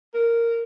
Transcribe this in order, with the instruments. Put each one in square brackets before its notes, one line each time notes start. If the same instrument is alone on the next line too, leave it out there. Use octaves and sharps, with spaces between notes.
[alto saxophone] A#4